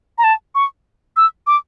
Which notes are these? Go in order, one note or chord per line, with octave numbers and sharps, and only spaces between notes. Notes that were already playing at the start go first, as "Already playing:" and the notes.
A#5
A5
C#6
E6
D6